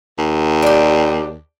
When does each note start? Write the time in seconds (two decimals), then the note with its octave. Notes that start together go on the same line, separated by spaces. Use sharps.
0.18 D#2
0.63 D4 G4